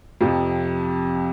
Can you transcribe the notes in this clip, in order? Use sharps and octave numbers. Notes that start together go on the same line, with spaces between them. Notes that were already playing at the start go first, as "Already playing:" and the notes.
F2 C3 F3